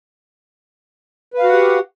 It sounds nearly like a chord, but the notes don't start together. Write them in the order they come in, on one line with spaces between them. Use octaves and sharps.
B4 F5 F#4 F#5 G4